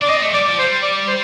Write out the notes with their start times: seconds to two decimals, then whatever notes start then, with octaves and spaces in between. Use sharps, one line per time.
0.02 D4 D5
0.08 C4 D#5
0.21 A3
0.28 F3
0.33 G3 D5
0.46 F3
0.59 G3 C5
0.83 D5
1.08 C5